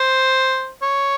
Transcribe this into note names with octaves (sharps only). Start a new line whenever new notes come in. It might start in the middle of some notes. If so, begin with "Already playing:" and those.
Already playing: C5
C#5